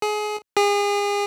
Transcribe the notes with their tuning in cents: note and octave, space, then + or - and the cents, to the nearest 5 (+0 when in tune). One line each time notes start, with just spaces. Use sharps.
G#4 +25
G#4 -35